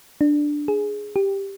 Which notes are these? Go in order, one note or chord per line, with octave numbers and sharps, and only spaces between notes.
D4
G#4
G4